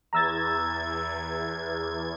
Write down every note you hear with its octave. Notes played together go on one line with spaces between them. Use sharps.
E2 A#5 E6 G#6 A6